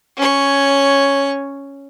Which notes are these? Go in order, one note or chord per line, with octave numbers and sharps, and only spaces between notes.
C#4 C#5